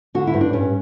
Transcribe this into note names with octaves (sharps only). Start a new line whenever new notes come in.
D3 F#4
E4
G2
D4
G2 C#4